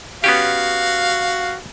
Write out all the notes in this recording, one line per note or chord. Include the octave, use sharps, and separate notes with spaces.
B3 C#4 F#4 G4 F5